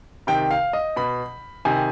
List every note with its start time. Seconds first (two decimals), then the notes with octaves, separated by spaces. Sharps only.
0.27 C3 D#3 G5
0.51 F5
0.73 D#5
0.96 B2 B5
1.65 C3 D#3 G#5